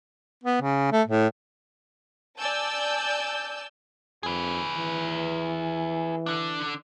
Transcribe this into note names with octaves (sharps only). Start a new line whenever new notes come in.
B3
C#3
A3
A2
D5 G#5 A5 E6 G6
F2 G#4 B4
E3
D3 D4